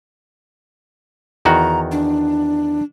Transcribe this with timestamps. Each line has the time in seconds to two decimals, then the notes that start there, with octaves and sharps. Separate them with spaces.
1.45 E2 D#3 F#4 A#5
1.91 D4